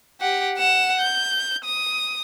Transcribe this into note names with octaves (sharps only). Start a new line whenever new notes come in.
G4 F#5
F#5 E7
G6
D#6